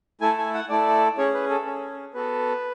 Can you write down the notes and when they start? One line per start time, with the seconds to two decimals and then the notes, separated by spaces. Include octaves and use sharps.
0.21 A3 E4 A4 G#5
0.38 G#5
0.54 F#5
0.69 A3 E4 A4 D5
1.17 C#4 G#4 C#5
1.34 B4
1.50 A4
1.66 C#4 G#4
2.14 B3 F#4 A4 B4